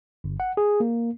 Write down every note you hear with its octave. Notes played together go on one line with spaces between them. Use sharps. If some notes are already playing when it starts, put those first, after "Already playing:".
G1
F#5
G#4
A#3